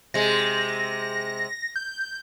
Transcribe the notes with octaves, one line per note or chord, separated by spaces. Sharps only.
C3 G#3 A#6
G6